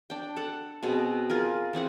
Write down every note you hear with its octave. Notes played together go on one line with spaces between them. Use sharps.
D4 G5
A4 F#5
B2 C4 G#4
F4 G#4 A#4
E3 C4 G#4 F#5